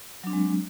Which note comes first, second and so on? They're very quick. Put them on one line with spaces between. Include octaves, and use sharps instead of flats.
F#3 D4 C4 G#3